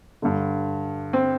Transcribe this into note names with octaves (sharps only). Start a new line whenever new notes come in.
G2 D3
C4